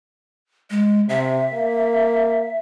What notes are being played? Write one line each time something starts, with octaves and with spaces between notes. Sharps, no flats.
G#3
C3 E5
A#3